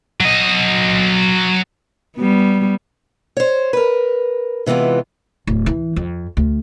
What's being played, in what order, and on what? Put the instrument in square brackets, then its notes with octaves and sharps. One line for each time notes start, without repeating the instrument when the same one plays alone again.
[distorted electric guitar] F#3 D#5
[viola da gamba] G3 B3
[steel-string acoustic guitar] C5 C#5
A#4 B4
C3 E3 G#3 B3 F4
[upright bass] D1
E3
F2
D2